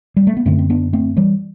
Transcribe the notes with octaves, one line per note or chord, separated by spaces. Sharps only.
G3
A3
B3
F#2 D3 A3 C4
C4
B3 D4
A3 C4
E3 G3